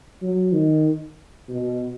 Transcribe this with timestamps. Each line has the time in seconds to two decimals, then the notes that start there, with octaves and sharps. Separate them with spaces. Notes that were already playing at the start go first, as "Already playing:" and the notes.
0.22 F#3
0.53 D#3
1.49 B2